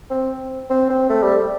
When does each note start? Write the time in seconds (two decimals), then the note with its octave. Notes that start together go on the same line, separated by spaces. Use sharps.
0.10 C4
0.70 C4
0.90 C4
1.09 A3
1.23 G3